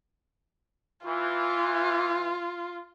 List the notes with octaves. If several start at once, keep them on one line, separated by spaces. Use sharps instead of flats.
E3 F4